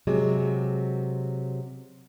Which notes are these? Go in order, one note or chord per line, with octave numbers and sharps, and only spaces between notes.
C3 F#3 G#3